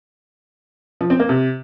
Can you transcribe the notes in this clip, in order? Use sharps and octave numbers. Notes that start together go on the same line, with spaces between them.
F3
C4
A#3
C3